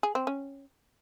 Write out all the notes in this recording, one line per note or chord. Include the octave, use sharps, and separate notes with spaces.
G#4
C4
C#4